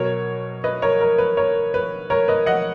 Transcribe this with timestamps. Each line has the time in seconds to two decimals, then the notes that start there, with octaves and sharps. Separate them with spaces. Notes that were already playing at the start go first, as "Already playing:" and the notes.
Already playing: B2 F#3 A#4 C#5
0.64 B4 D#5
0.82 A#4 C#5
1.01 A#4
1.18 B4
1.37 A#4 C#5
1.74 B4
2.10 A#4 C#5
2.28 B4 D#5
2.46 D#5 F#5